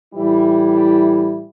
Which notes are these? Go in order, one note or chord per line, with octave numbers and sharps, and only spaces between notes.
A2 E3 G3 E4